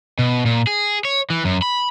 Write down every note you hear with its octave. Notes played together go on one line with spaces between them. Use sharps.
B2
A#2
G#4
C#5
E3
F#2
B5